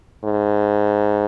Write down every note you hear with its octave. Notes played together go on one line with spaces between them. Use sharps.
G#2